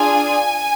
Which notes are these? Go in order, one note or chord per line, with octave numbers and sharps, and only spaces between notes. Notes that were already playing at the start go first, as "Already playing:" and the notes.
Already playing: D4 F4 G#4 G#5